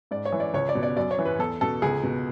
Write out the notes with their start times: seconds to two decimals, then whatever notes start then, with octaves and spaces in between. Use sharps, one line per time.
0.11 G#2 D5
0.25 C#5
0.32 E3
0.40 D5
0.54 C#2 C#5
0.69 D5
0.75 B2
0.83 D5
0.97 F#2 D5
1.11 C#5
1.19 E3
1.25 B4
1.39 E2 A4
1.61 B2 A4
1.82 C#2 G#4
2.03 B2